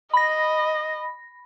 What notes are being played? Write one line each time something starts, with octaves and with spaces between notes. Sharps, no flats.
D#5 B5 A#6